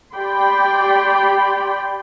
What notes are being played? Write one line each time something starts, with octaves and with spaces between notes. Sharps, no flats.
G4 D5 G5 B5 C6